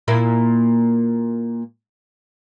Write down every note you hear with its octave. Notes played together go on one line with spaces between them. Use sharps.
A#2 A#3 E4